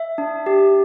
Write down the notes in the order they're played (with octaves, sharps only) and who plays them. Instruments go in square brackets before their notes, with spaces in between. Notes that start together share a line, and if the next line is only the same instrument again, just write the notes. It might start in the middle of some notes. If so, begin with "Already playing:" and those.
Already playing: [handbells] E5
D4
G4